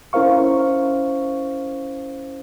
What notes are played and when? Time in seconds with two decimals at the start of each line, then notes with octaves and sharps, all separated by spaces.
0.13 C#4 E4 A#4 C5 F5 C#6